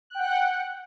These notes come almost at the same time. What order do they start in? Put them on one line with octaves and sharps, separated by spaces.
F#6 G5 F#5